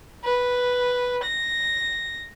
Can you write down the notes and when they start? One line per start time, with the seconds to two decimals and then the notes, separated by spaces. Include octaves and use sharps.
0.24 B4
1.23 A#6